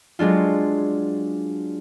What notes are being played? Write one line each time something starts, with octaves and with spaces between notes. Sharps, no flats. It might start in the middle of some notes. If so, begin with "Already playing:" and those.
F#3 G#3 D4 F4